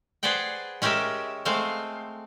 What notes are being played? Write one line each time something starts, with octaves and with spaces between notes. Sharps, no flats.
G#4 B4 C5 D5 F#5 G5
G#3 C#4 G4 A#4 E5
G#3 A3 C4 C5 F5